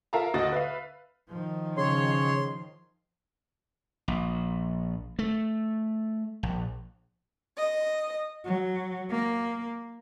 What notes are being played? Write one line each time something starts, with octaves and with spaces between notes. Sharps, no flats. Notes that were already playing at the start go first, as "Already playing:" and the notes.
F4 A#4 E5 F5 A5 A#5
D2 F#4 D#5 A6
B4 E5 F5
D#3 F3
C#3 C#5 C6
A#1
A3
A#1
D#5
F#3
A#3